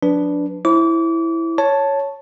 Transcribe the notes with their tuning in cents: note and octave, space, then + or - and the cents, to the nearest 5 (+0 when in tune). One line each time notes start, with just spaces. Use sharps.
F#3 -45 D4 -10 B4 +0
E4 +0 C5 +25 D6 -35
C#5 +0 A5 +0